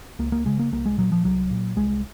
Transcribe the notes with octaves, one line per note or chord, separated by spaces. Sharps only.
C#2 A#3
A#3
C#3 G#3
A#3
C2 A#3
G#3
A#2 F#3
F3
C2 F#3
A#2
C2 G#3